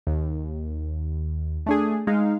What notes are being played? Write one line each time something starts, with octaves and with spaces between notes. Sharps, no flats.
D#2
A3 D4 G#4
G#3 D#4 F5